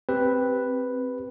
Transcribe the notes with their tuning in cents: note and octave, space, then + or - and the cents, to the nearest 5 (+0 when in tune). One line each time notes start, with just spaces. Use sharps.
C4 +0 G4 +0 B4 +0